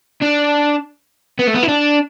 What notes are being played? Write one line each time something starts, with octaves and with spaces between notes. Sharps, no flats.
D4
B3
A3
B3
E4
D4